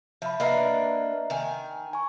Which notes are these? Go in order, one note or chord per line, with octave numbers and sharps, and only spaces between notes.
F3 E5 B5
A#3 D4 B4 D#5 E5 A#5
D#3 G#5
G#5 C#6